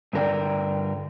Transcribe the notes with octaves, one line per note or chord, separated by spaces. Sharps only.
G2 D3 A#4 D5 G5